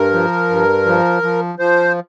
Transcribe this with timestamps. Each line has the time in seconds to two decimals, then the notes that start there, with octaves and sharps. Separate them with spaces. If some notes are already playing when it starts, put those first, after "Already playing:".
Already playing: G2 A#4
0.13 F3
0.49 G2
0.86 F3
1.23 F3
1.59 F3 C5